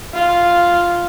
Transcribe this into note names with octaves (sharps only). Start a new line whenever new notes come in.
F4